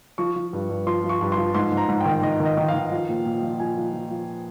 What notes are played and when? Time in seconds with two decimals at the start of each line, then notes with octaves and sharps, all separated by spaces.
0.18 F3 C#6
0.36 F3
0.53 G2
0.69 G2
0.87 F3 C6
1.04 F3
1.09 C#6
1.21 G2
1.32 C6
1.37 F3
1.54 G#2 C6
1.72 G#2
1.77 A#5
1.89 G#2
2.01 D#3 G5
2.22 D#3 D#5
2.40 D#3
2.45 D#5
2.57 D#3
2.68 F5
2.74 D#3
2.91 F3
3.09 A#2
3.25 A#2
3.42 F3
3.59 F3 G#5
3.77 F3
3.93 F3
4.11 F3